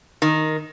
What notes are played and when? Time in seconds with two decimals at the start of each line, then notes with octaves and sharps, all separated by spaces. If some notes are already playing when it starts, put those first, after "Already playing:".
0.22 D#3